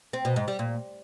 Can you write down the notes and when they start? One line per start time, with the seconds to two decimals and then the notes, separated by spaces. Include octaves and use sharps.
0.13 C4
0.25 B2
0.36 G#2
0.48 G3
0.59 A#2